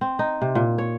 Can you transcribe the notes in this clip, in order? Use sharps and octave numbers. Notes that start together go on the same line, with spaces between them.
C4
D#4
C3
A#2
C#5